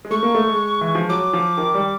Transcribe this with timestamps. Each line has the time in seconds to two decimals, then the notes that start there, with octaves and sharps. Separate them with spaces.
0.05 G#3
0.11 A3 C#6
0.23 A#3
0.35 A3
0.47 G#3
0.81 E3
0.95 F3
1.09 F#3 D6
1.33 F3
1.58 D#3
1.74 G3